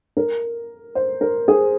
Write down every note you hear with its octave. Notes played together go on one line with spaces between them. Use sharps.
A#4
C5
A#4
G#4